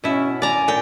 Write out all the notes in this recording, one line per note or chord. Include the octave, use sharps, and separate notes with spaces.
B2 C#4 E4
D5 G#5 A#5
A#2 G5